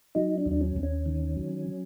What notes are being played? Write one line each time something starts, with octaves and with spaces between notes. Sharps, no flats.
F#3 D#4
D4
D#2
D4
C#4
D#2
C#4
D#3
F#3